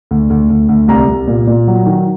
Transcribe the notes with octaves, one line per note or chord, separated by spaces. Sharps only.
D2
D2
D2
D2
C2 A#5
C2
A#2
A#2
F#3
D#3